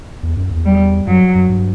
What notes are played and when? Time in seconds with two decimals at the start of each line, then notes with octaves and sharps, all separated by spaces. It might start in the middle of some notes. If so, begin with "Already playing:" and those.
0.23 E2
0.37 F#2
0.51 E2
0.66 G3
1.07 F#2 F#3
1.35 F#2
1.49 G2